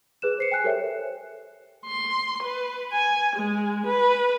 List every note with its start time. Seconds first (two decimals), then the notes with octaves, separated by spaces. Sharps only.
0.22 G#4 B4 F#6 E7
0.39 C5 C7 C#7
0.52 G5 G#5 F#6 C7
0.64 G4 A4 A#4 C5 C#5 E5
1.86 C6
2.43 B4
2.92 G#5
3.36 G#3
3.86 B4